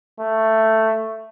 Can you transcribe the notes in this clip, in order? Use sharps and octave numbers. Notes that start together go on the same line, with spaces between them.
A3